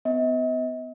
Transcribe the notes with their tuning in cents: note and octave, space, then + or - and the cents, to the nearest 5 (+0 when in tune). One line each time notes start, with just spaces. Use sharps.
B3 +30 D#5 +45